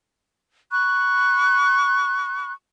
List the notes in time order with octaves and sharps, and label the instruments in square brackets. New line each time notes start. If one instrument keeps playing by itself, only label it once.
[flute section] B5 C#6 F#6